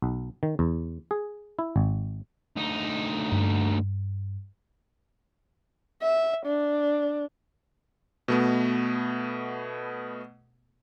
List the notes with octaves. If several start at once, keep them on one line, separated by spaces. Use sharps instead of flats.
B1
D#3
E2
G#4
E4
G#1
D2 D#4
G2
E5
D4
B2 A3 B3